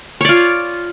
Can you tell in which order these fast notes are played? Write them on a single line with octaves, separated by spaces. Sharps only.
C#5 D5 F4